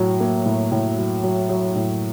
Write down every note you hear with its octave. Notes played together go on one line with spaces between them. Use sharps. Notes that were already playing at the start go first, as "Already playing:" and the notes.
Already playing: A2 F#3
A#3
A2
A2
F#3
F#3
F#3
A2